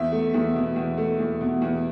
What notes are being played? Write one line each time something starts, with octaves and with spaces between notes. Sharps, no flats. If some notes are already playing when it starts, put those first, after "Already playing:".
Already playing: E2 E5
A3
E2
B2
E2
A3
E2
B2
E2